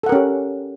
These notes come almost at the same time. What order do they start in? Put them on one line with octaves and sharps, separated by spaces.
A4 F#5 A#4 C#4 G4